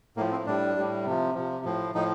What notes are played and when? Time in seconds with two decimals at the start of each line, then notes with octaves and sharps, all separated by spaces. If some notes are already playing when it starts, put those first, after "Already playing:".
0.17 A2 A#3
0.20 F3
0.32 C4
0.46 A2 G3 D4
0.76 A2 G3
1.05 C3 F3
1.35 C3 F3
1.65 A2 F3
1.95 A2 F3 D#4